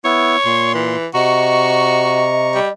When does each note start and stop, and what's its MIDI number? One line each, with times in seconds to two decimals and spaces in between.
0.05 0.36 59
0.05 0.36 64
0.05 0.71 73
0.45 0.96 46
0.45 0.96 84
0.74 1.07 52
1.14 2.59 48
1.14 2.25 66
1.14 2.72 75
1.14 2.59 82
1.14 2.59 85
2.55 2.69 55